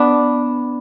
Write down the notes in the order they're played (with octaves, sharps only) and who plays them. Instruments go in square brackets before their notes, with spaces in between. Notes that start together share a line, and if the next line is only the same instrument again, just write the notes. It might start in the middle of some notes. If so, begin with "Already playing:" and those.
Already playing: [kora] B3 D4